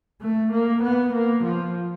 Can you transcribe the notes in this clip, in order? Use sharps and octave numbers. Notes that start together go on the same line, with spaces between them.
A3
A#3
B3
A#3
F3